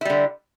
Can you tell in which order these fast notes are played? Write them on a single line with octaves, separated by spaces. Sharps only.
E4 G3 D3